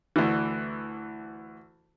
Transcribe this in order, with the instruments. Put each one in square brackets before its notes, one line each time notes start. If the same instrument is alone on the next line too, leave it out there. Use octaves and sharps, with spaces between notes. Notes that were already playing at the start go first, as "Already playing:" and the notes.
[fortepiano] D2 E3